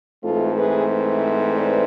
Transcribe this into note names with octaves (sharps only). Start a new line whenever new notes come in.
G#2 E3 A3 C4 F4 A4
G#4 B4
B4 D5